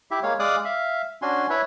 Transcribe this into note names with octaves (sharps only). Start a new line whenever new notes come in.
E4 G4 E5
G#3 A#3 C#5 F5
G#3 D5 F5 D6 D#6 F#6
E5 F5
C#4 D4 F#4 G#5 C6
E4 B4 C#5 E5